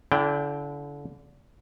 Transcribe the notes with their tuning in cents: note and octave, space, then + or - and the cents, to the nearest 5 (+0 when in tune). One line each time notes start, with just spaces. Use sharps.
D3 -30 E4 +25 G5 +0